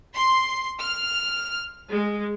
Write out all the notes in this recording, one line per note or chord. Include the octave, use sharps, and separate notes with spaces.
C6
F6
G#3